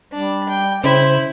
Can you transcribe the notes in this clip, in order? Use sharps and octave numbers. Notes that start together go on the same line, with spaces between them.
G3 D4
G5
C#3 E4 C5